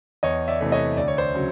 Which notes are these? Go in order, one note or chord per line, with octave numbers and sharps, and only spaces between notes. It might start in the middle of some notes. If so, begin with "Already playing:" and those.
E2 C#5 D#5
D5 E5
C3 E3 A3
C#5 D#5
D2 D5
C#5
C5 D5
C#3 F#3